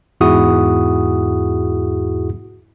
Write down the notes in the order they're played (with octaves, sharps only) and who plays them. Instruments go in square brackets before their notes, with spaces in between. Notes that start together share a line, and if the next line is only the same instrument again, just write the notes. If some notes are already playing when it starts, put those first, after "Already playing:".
[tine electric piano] E2 G#2 E4 F#4 G#4 D#6